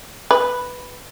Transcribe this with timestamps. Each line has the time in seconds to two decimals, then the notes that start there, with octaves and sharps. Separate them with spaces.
0.31 B4